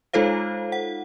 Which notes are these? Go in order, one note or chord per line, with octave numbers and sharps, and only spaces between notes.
G#3 D#4 F4 A4 C5 F5
F#5